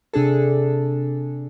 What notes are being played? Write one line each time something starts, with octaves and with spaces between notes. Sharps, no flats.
C3 D4 G#4 A4